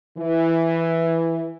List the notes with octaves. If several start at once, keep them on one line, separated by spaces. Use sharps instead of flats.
E3